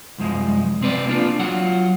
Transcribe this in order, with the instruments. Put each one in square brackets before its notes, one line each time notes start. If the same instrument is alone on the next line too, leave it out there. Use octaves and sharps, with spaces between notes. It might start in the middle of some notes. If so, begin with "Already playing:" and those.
[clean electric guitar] C2 F#2 F3 G#3
C3 C4 B4 D5
A#3 D4 F4
F#3 F4 F#5